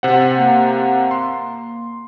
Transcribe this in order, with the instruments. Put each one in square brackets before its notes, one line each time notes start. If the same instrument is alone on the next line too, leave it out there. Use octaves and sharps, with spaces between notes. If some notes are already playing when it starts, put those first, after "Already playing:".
[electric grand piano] C3 C5 F#5
[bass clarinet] A#3
[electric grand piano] C6